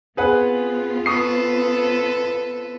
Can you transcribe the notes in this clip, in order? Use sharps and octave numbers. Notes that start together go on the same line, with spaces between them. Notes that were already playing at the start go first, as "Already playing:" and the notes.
B3 C4 F4 G#4 B4 F#5
A4 B4 C#6 D#6 C7